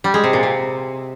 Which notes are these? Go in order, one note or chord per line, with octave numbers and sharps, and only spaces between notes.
G3
G#3
C3
A#2
C3